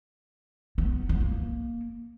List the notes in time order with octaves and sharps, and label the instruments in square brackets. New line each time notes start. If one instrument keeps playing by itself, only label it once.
[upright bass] B3
B3
A#3